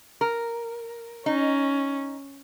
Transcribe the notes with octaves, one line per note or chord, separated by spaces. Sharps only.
A#4
C#4 D#4